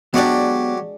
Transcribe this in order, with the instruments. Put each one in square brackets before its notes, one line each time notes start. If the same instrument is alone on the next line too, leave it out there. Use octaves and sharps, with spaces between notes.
[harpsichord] F#3 G4 [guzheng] G#3 D4 [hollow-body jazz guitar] B3 D5